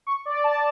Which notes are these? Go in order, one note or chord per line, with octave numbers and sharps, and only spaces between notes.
C#6
D5
A5